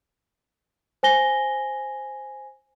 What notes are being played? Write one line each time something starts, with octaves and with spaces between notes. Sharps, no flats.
C5 G#5 A#6 G7